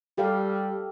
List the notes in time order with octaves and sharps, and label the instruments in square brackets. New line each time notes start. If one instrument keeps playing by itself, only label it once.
[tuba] G3 [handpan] G4 A4 F5